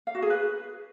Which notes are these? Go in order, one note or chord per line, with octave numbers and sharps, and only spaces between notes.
F5
F#4
G#4
B4